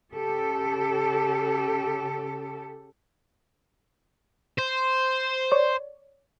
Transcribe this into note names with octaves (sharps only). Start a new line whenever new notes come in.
C#3 G4 A4
C5
C#5 D5